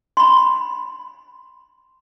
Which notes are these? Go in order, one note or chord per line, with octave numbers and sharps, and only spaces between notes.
B5 C6